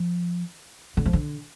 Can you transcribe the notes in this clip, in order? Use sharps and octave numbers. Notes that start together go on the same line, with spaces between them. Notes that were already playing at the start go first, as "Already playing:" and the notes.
Already playing: F3
D3
F3
D3